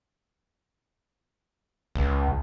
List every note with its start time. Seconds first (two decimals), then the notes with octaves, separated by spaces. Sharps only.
1.95 C#2